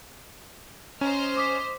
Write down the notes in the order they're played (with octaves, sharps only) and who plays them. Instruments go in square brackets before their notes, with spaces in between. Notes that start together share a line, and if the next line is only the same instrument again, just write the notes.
[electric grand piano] C#4 [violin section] C5 D#5 F6 [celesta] A#5
[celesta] D6 D#6 B6